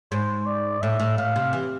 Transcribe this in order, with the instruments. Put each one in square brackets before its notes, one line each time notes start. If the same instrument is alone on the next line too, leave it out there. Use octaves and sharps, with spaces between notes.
[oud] G#2 [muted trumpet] C5
[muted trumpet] D5
[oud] A2 [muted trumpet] E5
[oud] A2
[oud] A2 [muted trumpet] F5
[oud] C3
E3